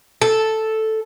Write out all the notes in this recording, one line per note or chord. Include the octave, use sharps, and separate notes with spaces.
A4